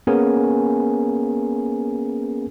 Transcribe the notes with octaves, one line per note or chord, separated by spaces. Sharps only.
A#3 B3 C#4 G#4 A#4 G#5